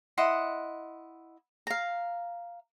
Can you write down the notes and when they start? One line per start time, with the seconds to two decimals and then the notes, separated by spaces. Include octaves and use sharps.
0.18 E4 D#5 F#5 C6
1.67 F5 A#5